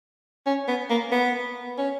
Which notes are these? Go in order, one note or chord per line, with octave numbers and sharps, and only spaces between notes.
C#4
B3
A#3
B3
C#4